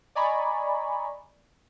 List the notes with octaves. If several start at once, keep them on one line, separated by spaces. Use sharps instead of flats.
D5 D#5 G#5 A#5 B5 C#6